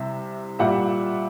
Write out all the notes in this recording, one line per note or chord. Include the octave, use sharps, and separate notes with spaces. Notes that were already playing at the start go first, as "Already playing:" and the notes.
Already playing: C2 C3 E5
A#2 G3 E5 F#5